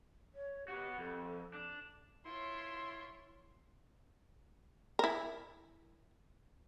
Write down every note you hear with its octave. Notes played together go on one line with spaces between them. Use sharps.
C#5
F#4 G4 B4
F2 A4
D4
E4 F4 C#5 C6
E4 A#4